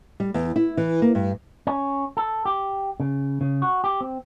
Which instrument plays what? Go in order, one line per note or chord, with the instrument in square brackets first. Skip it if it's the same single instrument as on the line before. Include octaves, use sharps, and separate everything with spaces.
[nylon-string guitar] G3
E2
E4
E3
A#3
G2
[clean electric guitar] C#4
A4
G4
C#3
C#3
F#4
G4
C4